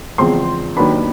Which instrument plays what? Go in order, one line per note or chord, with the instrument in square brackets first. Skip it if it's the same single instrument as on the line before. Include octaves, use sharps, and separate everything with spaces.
[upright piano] E2 C#3 F3 G#3 C4 C6
D#2 D#3 F#3 B3 D4 B5